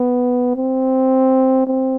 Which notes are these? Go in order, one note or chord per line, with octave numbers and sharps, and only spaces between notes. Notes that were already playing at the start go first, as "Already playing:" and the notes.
Already playing: B3
C4
C4